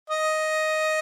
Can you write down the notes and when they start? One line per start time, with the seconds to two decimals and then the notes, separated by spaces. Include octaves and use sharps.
0.10 D#5